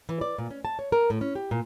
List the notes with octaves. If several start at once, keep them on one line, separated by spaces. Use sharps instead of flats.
E3
D5
A#2
C#4
A5
C#5
A#4
A2
C#4
G4
A#2